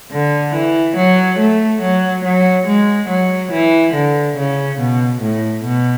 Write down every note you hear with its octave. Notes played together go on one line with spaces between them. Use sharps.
D3
E3
F#3
A3
F#3
F#3
G#3
F#3
E3
D3
C#3
B2
A2
B2